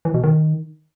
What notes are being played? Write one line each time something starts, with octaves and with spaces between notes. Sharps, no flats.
E3
B2
D#3